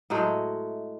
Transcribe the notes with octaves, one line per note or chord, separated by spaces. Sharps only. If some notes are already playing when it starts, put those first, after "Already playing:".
A2 F#3 G#3 A3